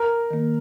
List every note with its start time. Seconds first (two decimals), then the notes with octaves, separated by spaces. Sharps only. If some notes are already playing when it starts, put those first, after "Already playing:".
Already playing: A#4
0.31 D#3 A#3